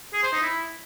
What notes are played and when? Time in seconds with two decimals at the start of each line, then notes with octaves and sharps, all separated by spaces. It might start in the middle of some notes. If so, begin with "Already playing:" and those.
0.14 G#4
0.23 C5
0.33 D#4
0.43 E4